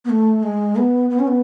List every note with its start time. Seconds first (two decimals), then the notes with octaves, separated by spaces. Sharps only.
0.05 B3
0.09 A3
0.43 G#3
0.76 B3
1.10 B3
1.19 C#4
1.27 B3